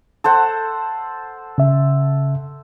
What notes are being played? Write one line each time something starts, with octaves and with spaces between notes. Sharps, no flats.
A4 C5 F#5
C#3 E5